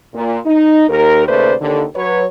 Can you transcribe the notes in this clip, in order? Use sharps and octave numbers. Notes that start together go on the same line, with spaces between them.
A#2
D#4
D#2 A#4
D#2 C#3 A3 B4 C5 D5
D#2 D3
F#3 B4 C#5